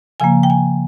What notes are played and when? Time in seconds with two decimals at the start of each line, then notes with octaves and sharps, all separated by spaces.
0.20 C#3 F3 A#3 G#5
0.43 G5
0.50 G#5